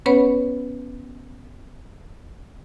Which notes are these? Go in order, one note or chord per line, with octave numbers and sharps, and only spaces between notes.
B3 C#4 B4 C#5 F#5 B5